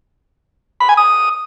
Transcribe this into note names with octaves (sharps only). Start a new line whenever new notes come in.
B5
G#5
D#6